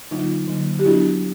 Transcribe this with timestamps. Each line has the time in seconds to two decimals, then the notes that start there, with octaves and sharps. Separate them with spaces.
0.11 D3 F#3 A#3 D#4 F4
0.48 D3 F#3 A#3
0.79 G4
0.85 F#3 B3 D4 E4 F#4